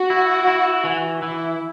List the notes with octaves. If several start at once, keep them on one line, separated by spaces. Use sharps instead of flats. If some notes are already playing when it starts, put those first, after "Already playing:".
Already playing: F#4
E4
E4
E3
E3 E4